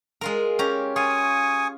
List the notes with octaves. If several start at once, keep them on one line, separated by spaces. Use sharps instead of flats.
G#3 F4 A#4
C#4 G4 A#5
F4 G#5 C#6 D#6